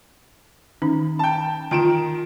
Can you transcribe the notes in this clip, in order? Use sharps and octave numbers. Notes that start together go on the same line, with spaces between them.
D#3 C#4 D#4
G5 A5
D#3 F4 G5 D7 E7